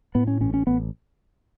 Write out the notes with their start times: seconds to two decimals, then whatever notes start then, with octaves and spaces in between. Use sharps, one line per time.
0.15 A2 B3
0.27 C#4
0.40 A1 C#4
0.54 C#4
0.67 A1 B3